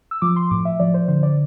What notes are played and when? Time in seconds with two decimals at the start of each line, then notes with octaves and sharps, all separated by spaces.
0.11 E6
0.22 F3 D6
0.36 C6
0.51 A2 D6
0.65 E5
0.80 F3 D5
0.94 C5
1.08 D3 C5
1.23 D5